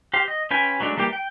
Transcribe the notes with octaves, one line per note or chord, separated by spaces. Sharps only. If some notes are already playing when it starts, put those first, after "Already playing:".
G4 C5 F5
D#5
C#4 F4 B4 G5 G#5
F#3 G#3 A3 D4
E3 G3 A#3 G4 D6
G5